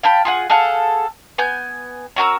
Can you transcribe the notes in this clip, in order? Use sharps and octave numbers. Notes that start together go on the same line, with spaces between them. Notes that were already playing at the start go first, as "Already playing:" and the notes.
F5 G5 A5 B5
F4 G#4 F#5
G#4 A4 F5 F#5
B3 G#5 G6
C#4 F#4 A#4 E6